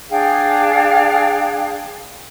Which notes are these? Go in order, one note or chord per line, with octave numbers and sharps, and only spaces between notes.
D4 G#4 F5 G5